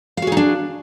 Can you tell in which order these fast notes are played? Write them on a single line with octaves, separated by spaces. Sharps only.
F5 F#4 G#4 D#4 D4